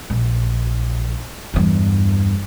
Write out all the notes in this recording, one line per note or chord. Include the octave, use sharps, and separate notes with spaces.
A#1
E2 G2